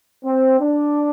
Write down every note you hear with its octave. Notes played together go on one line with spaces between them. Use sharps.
C4
D4